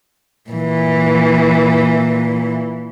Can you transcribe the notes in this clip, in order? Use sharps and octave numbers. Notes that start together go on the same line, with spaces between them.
A#2 E3